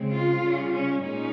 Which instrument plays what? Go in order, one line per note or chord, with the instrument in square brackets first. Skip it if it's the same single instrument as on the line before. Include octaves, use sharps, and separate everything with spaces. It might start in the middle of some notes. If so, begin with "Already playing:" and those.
Already playing: [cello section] C#3 G#3 C4
F4
C#3 G3 C#4
C#4
A#2 G#3 C#4 D#4